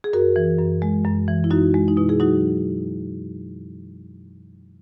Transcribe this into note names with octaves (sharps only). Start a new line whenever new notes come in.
G#4
F#2 F#4 A#4
E3
F#2
G#3
F#2
E3
E4
F#2 D#4 F#4
G#3
D#4
B2 E4
E4 G#4
F#3 D#4 F#4